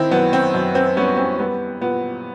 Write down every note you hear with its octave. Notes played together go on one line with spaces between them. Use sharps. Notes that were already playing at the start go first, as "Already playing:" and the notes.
Already playing: D#3 C4 E4
F#2 B3
C4
F#2
C4
G3 B3 C#4
C4
G3 B3
A#2 B3